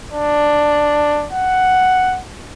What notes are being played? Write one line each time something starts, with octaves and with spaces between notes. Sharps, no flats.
D4
F#5